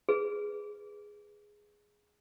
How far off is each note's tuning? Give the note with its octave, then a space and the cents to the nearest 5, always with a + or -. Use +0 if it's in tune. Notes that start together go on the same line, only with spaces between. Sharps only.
G#4 +0 B4 +0